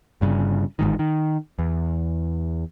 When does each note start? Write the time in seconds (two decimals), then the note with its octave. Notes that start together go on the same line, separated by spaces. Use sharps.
0.21 G1 G2 A#2 C#3
0.79 G1 G#2 D#3
0.99 D#3
1.59 E2